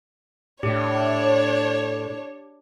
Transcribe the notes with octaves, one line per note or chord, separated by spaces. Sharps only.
A2 D4 G4 C#5